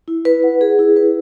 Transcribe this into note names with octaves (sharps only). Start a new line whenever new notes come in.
E4
B4
F#5
G#4
E4
B4